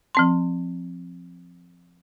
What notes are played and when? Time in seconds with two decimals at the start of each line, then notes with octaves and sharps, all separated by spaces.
0.15 F3 C4 C6